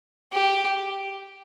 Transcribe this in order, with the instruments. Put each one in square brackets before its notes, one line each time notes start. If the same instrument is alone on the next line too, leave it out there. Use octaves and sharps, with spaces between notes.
[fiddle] G4